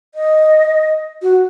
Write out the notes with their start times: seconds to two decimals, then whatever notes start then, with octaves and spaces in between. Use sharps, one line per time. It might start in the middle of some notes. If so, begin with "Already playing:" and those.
0.15 D#5
1.22 F#4